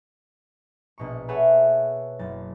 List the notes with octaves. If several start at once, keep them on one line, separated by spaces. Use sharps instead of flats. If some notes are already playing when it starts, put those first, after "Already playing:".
A#1 B2 C#6
G#4 A4 B4 C#5 E5 F#5
F#1 A6